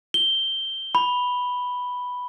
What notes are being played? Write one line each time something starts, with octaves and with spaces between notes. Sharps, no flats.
G7
B5